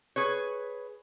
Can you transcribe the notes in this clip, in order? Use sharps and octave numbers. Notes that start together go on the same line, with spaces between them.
G#4 B4 C#5